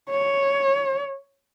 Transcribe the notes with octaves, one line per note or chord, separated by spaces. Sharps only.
C#5